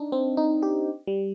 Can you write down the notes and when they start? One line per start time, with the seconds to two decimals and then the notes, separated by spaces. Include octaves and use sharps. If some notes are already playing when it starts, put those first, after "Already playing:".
Already playing: D4 D#4
0.12 C4
0.37 D#4
0.63 G4
1.07 G3